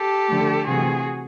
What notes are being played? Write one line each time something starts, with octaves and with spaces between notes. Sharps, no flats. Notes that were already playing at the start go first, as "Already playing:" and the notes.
Already playing: G4 A4
D3 F3 A3
C3 E3 A3 F#4 G#4